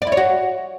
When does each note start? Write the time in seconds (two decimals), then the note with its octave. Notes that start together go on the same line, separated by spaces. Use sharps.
0.02 D5
0.07 E4
0.12 C#5
0.17 F#4